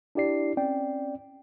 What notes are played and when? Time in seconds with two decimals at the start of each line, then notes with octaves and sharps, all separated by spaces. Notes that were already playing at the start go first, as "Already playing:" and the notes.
0.15 D4 E4 G4 D5 C7
0.57 C4 C#4 D5 G5